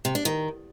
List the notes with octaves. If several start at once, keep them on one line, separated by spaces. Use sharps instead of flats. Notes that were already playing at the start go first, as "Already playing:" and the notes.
C3
D4
D#3